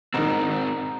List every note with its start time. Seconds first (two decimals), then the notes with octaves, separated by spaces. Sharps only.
0.14 G#2 B2 D#3 C4 A#5